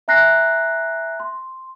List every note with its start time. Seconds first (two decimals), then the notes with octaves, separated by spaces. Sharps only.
0.08 E5 G#5 A#5 F#6 A#6 C7
1.20 C6